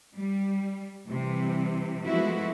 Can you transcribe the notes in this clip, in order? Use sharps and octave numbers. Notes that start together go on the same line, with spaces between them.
G3
C3 E3 G3
F3 G#3 A3 B3 E4 F#4